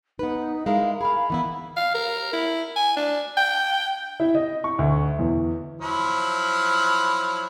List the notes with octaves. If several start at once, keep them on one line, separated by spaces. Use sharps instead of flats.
B3 D#4 B4
G#3 E4 A#4 F5
G#4 A#4 F5 B5
E3 B3 E4
F5
A#4
E4
G#5
D4
G5
E4
D#5
C#6
D2
E2
F3 F#3 E4